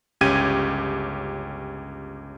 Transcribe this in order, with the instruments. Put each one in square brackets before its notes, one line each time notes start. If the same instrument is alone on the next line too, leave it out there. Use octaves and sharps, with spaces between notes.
[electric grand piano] G1 C#2 C#4 G4 G#6 D#7